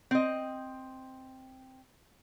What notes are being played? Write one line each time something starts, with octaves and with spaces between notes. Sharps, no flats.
C4 D#5